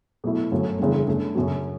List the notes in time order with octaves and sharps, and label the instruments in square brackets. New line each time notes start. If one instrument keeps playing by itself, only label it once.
[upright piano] B2 F#3 A3 E4
G1 F#2 F#3 A3
F#1 E2 D3 G3
F#2 D3 A3
F#1 F#2 D3 F#3